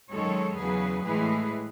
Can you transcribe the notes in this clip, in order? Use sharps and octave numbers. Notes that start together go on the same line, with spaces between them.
F#2 D#3 G#3 A4 C#5
E2 C#3 F#3 G#4 B4
A2 E3 G#3 G#4 B4